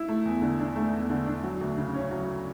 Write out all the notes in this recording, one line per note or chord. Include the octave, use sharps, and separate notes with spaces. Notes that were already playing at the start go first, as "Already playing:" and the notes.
Already playing: E4
A3
E2
D3
D4
A3
E2
D3
D4
F#3
D2
C#3
C#4
F#3